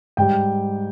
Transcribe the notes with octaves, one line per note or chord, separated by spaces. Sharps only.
G#2 G3 G5